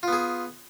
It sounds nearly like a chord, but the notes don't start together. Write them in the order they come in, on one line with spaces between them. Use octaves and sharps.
F4 B3 G#4